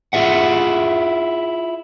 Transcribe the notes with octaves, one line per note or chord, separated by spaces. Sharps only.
E4 F4 G#4 E5 F#5